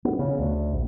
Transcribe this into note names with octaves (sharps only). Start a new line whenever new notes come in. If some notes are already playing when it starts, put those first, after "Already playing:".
B3
C#3
D2
A#1